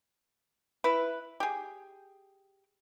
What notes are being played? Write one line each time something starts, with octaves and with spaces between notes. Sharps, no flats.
E4 B4
G4 G#4